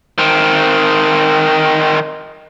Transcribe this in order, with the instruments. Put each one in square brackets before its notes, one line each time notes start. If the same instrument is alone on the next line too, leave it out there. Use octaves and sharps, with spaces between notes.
[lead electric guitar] D#3 C4